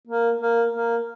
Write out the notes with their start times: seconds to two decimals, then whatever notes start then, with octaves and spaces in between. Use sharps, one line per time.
0.07 A#3
0.41 A#3
0.73 A#3